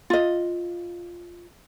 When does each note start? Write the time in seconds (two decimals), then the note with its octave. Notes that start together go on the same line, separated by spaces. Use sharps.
0.10 F4 D#5